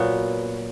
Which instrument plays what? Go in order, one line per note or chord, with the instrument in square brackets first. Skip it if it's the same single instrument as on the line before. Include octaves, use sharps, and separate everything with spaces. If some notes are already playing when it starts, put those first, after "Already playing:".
Already playing: [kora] A#2 F#3 B3